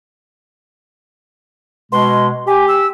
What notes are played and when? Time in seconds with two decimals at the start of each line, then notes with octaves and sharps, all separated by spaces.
1.92 B2 G#3 C6
2.47 G4 G#5
2.68 E6